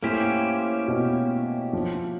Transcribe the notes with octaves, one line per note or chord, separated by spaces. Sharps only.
A2 A#3 C#4 E4 G4 C5
B2
F3